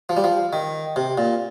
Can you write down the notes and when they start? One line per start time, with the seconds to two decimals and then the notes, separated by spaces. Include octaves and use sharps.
0.09 F3
0.17 G3
0.24 F3
0.53 D#3
0.96 C3
1.18 A#2